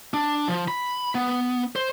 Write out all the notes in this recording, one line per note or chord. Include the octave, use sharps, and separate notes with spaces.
D4
F3
B5
B3
C5